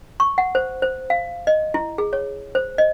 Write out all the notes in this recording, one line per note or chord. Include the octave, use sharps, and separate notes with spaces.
C#6
F#5
C5
C5
F5
D#5
E4
G#4
C#5
C5
D#5